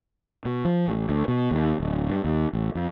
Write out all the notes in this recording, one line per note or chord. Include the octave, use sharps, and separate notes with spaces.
B2
F3
A1
D2
B2
D#2
D1
G2
D#2
A1
F2